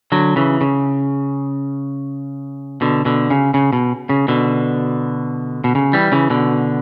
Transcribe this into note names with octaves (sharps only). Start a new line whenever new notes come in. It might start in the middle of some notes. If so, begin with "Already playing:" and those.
D3 F#3
C#3 E3
C#3
B2 D3
B2 D3
C#3
C#3
B2
C#3
B2 D3
B2
C#3
E3 G3
C#3 E3
B2 D3